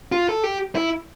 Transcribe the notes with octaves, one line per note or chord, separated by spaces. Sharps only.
F4
A4
G4
E4